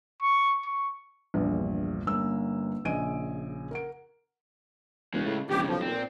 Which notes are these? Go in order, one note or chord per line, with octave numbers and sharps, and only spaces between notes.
C#6
C#6
A#1 E2 G2
G1 A#3 C#4 B4 E6
A#1 C#3 D#5 G#5 D7 D#7
A#4 F#5 D7
E1 C#3 G#3
A2
E1 F2 C#3 G4
B1 F3
A#2 C4